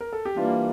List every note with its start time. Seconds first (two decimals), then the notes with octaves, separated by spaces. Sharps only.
0.01 A#4
0.13 A4
0.25 G4
0.36 E3 G3 A#3 D4 F4